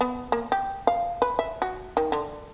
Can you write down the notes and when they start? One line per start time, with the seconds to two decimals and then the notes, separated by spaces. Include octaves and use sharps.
0.01 B3
0.32 A#3
0.52 G4
0.87 F5
1.22 B4
1.39 E5
1.62 F#4
1.97 D#3
2.12 D3